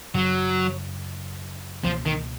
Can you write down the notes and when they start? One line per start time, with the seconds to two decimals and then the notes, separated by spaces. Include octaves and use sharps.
0.14 F#1 F#2 C#3 F#3
1.84 C#2 B2 F3 A#3
2.06 D#3